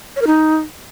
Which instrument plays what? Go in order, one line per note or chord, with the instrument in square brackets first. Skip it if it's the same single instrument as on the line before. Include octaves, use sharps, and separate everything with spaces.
[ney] C#5
A#4
D#4